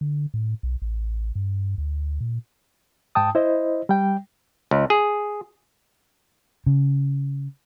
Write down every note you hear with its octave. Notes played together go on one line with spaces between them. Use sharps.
D3
A2
B1
A1
G2
D2
A#2
G#2 G5 A5 D#6
E4 C5 D#5
G3 G5
C#2
G#4
C#3